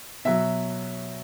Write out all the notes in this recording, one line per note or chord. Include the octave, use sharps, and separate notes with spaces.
B2 F#3 E5